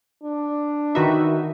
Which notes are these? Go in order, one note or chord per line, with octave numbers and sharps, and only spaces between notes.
D4
D#3 D#4 F#4 B4 E5